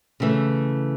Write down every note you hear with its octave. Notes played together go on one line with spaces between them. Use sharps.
C#3 E3 A3